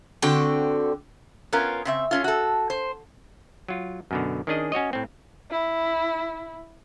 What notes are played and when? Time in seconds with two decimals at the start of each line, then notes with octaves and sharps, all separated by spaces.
0.22 D3 C4 F#4 G5
1.53 B3 C#4 F4 A#4
1.85 C#3 C4 E5
2.11 A3 C#4 F4
2.24 F#4 A4
2.70 C5
3.68 F#3 F4
4.11 F#2 B2 D3
4.47 D#3 C#4 D4 G#4 D#5
4.72 C#4 F#4 C#5 D#5
4.93 A2 C4
5.51 E4